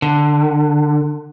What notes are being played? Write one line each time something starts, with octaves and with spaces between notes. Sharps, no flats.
D3